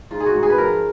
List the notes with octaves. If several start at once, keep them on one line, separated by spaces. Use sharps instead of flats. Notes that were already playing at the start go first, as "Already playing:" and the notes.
G#2 F4
G#4
F#4
G#2
G#4
B4
F3 A#4